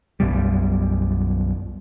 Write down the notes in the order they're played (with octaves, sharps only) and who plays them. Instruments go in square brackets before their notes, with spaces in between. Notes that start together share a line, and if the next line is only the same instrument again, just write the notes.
[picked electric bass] B1 F#2 B2 G3